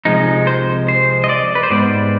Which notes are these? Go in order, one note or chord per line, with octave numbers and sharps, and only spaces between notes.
C2 C3 F3 G#3 D#4
C5
C5
D#5
D5
B4
C5
G#2 G3 B3 D5